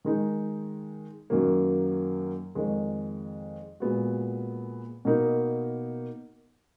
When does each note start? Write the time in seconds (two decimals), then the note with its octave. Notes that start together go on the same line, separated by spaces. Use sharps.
0.05 D#3 G#3 D#4
1.30 F#2 D#3 F#3 A#3
2.55 F2 D#3 G#3
3.80 A#2 G#3 B3 F#4
5.05 B2 A#3 D#4 A#4